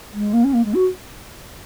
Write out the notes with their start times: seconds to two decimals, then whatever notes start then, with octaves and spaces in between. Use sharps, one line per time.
0.13 G#3
0.33 A#3
0.44 C#4
0.53 A#3
0.64 G#3
0.74 F#4